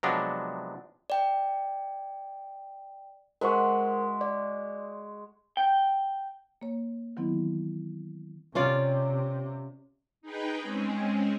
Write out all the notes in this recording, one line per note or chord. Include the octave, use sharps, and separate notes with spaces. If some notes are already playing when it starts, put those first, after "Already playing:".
C3 F3 F#3 G#3 B3 D4
D5 G5
G#3 F#4 A#4 C5 E5 C#6
D5
G5
A#3 C#5
D#3 E3 F#3 B3 C4 E4
C3 C#4 F4 D5
D#4 G#4 B4 G5
G#3 C4 C#4 G#4